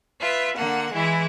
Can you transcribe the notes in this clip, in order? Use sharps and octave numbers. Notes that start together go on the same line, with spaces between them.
F4 B4 E5
D3 A#3 F#5
E3 G#3 E4